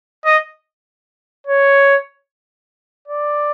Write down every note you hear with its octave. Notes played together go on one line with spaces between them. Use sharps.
D#5
C#5
D5